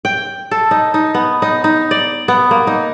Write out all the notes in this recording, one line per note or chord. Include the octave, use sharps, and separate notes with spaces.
G5
A4
D#4
D#4
B3
D#4
D#4
D5
B3
A#3
D#4